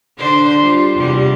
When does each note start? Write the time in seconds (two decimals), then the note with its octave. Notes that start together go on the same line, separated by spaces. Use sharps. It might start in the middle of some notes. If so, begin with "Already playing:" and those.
0.18 D3 D4 C5
0.61 G3 F4
0.95 E2 C3 G3